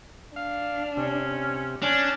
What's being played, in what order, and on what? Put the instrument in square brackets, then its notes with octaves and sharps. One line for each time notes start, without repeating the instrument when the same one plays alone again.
[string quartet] D4 [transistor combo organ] F5
[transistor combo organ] C3 [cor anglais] C#4
[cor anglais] C#4 [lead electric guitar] D4